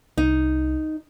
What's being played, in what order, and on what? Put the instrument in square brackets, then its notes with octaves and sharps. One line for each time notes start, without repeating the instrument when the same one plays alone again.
[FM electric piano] C2 [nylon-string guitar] D#4